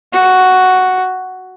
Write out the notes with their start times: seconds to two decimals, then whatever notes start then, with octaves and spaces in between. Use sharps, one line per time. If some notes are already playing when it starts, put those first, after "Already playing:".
0.13 F#4